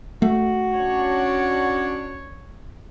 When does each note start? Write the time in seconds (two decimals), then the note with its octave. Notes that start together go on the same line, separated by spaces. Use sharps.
0.22 A3 F#4
0.76 C#4 D4 C#5